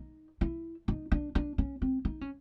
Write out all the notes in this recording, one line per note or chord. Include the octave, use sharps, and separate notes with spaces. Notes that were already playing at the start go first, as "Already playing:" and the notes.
Already playing: D#4
E4
D#4
D4
D4
C#4
C4
D#4
C#4